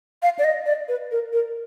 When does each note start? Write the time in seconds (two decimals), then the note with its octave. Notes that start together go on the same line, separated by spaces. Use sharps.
0.23 F5
0.39 D5
0.44 D#5
0.66 D5
0.88 B4
1.11 A#4
1.33 A#4